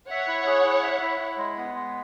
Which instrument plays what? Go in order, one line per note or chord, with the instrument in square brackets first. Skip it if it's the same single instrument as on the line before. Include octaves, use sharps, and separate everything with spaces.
[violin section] C#5 F#5 [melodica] E5
[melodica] E4
G#4
E4
E5
E4
E4
G#3
B3
G#3